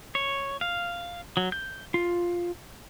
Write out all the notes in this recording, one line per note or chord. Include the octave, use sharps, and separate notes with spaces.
C#5
F5
F#3
G6
F4